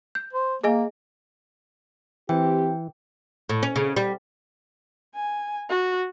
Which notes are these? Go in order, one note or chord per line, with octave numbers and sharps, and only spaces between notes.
G6
C5
A#3 G#4 D#5 G#5
E3 C4 G4 G5
A2
C#4
C#3
G3
G#5
F#4